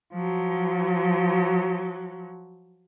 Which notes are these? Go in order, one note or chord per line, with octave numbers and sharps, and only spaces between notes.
F3 F#3